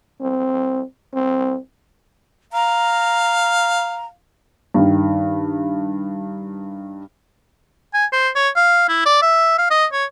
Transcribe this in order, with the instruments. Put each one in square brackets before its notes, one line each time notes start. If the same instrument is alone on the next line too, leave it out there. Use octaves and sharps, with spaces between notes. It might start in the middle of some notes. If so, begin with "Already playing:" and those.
[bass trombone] C4
C4
[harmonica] F5 [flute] A#5
[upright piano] G2 D#3
[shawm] G#5
C5
C#5
F5
E4
D5
E5
F5
D#5
C#5